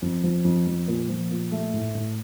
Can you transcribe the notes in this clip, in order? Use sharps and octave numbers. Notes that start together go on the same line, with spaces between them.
F2
F3
F2
F3
A#2
F3
A#2
A3
A2
A2